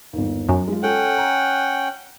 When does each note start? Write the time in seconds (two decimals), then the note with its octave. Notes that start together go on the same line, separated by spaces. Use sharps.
0.13 G1 D#2
0.49 F#2
0.68 G#3 F4
0.83 C#4 A4 F#5 G5
1.18 A#5